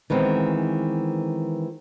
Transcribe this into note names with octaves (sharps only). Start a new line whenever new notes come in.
D#3 E3 G#3 B3 C4